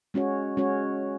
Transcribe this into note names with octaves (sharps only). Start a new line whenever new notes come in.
G#3 C#4 F#4 C#5
G#3 C#4 F#4 C#5